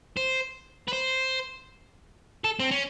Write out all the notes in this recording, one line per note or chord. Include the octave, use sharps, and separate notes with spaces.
C5
B4
C5
A4
C4
C#4